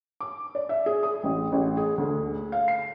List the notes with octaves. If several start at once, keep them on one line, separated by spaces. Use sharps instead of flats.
D6
D5
E5
G#4
D#6
A1
A1
G#4
D2
F5
C7